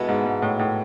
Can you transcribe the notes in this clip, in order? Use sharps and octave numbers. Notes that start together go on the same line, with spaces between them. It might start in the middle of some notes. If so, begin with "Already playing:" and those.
Already playing: B2 G#3 B3 E4 A4
G#2
G#2
A2
A2